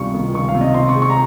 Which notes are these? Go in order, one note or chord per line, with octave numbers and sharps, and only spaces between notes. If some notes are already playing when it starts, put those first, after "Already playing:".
Already playing: C#2 C3 D#3 G3 C#6
D#3
C#2 C#6
F5
C3
D#5
C4 C6
C#6
G#3
C#6
A#5